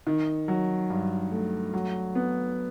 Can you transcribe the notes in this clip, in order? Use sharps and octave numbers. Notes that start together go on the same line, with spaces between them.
D#3
F#3
G2
A3
F#3
B3